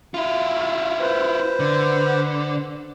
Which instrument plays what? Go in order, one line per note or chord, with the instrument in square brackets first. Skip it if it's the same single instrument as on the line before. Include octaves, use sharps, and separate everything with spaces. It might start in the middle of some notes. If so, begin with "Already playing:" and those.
[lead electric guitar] E4 F4
[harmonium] B4 C5
[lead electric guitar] D3